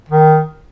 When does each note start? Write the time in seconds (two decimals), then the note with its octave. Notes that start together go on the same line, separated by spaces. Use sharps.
0.08 D#3